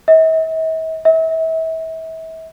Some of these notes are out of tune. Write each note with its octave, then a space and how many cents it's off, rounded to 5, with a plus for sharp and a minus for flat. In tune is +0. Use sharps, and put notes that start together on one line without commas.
E5 -45
E5 -35